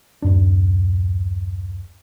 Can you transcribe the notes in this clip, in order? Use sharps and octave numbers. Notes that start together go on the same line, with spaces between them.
D1 F#2 D4